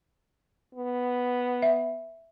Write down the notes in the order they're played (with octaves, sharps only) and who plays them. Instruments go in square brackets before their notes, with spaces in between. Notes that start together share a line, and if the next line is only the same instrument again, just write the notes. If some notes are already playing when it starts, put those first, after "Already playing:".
[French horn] B3
[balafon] E5